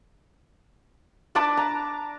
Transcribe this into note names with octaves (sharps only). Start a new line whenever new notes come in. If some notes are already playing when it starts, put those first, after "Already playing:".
D4 B4 A5 D6
A#5